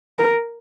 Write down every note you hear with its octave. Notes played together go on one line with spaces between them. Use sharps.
A#4